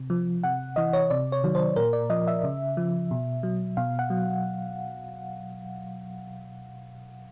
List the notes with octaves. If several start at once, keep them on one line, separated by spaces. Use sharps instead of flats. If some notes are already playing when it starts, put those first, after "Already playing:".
Already playing: C3
F3
C3 F#5
E3 D#5
C#5
C3 D5
C#5
D#3 F#3
C5
A#2 A#4
D5
F3 D#5
E5
C#3
F3
B2
F#3
B2 F5
F#5
F#3